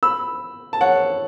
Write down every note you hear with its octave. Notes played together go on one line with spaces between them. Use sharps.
B5 E6
A5
C#5 F#5